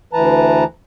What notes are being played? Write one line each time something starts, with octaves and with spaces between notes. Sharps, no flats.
D2 E3 B4 A5 A#5